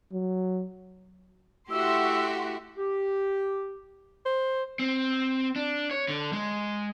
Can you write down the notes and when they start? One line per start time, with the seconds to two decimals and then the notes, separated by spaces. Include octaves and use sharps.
0.13 F#3
1.70 A3 E4 F#4 G4 E5 C6 E6
2.77 G4
4.26 C5
4.79 C4
5.56 D4
5.91 C#5
6.08 D3
6.33 G#3